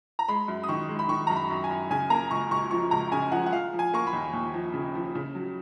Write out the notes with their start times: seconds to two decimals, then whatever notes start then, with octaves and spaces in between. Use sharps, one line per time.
0.19 A#5
0.28 G#3 B5
0.48 F#2
0.64 D#6
0.69 D#3 C#6
0.88 G#3
0.99 B5
1.09 D#3 C#6
1.27 F#2 A#5
1.36 B5
1.50 F#2
1.64 G#5
1.71 F#2
1.90 C#3 G#5
2.10 A#3 A#5
2.31 C#2 C#6
2.51 C#2 C#6
2.71 F3 C#6
2.91 C#2 A#5
3.12 C#3 G#5
3.32 F3 F#5
3.46 F#5
3.53 F3 F5
3.73 F3
3.79 G#5
3.94 A#3 C#6
4.07 B5
4.13 D#2
4.33 D#2
4.53 F3
4.74 C#3
4.95 F3
5.15 C#3
5.35 F#3